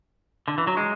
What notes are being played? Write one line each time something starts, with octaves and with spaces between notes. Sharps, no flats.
D3
E3
F#3
G#3